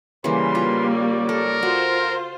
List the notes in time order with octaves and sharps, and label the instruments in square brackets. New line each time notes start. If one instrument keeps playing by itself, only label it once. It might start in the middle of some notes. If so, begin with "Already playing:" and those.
[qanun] C#3 E3 [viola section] G3 A#3 [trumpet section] B4 C6
[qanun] F4
[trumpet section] C#5 D5
[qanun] A4 [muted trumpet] A#4
[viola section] F4 C5 [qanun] F#4